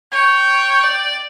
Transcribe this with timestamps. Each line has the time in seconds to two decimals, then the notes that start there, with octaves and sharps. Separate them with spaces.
0.12 C#5 G5
0.84 D5